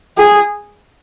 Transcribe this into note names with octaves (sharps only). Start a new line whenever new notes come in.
G#4